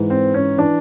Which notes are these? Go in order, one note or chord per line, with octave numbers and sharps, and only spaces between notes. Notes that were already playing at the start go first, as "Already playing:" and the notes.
Already playing: G#2 E3
C4
C#4
E3 D4